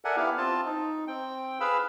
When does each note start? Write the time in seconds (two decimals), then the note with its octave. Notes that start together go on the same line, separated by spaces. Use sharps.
0.05 A4 A#4 D5 E5 F#5 G#5
0.16 B3 E4 G4 F5
0.37 C4 F4 A5
0.65 D#4
1.07 C4 G5
1.60 G#4 B4 F5 B5 E6